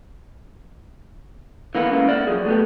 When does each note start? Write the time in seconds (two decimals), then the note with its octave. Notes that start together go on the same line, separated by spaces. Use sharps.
1.75 E3 A#3 B3 E4
1.89 C#2 C#3 A#3 B3
2.08 A#4 D5 E5 F#5
2.27 F3 F#3 G#4
2.46 A3 B3 G4